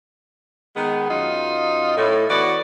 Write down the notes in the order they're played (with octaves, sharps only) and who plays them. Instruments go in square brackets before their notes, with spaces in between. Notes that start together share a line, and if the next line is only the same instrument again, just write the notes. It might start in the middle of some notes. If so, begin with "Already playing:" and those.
[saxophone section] D#3 G#3 B3
F#2 D#4 F4
A2
E3 B3 F#4 D5